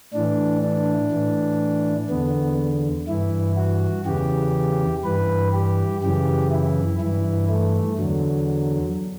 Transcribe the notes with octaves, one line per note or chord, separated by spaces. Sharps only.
A2 E3 D4
D4
A2 E3
E2 D3 B3
G2 E3 E4
F#4
E2 C#3 E3 G4
G2 E3 B4
G4
F#2 C#3 E3 G4
E4
G2 E3 E4
A3
E2 D3 F#3